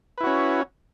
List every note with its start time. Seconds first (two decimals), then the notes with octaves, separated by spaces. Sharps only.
0.18 B4
0.21 E4
0.24 F#4
0.27 C#4